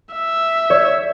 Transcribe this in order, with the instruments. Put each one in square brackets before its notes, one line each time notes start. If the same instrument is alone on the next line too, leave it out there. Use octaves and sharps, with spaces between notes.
[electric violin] E5
[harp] C#5 [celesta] D5